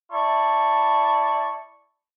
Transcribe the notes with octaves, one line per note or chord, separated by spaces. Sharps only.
E4 D5 A5 C#6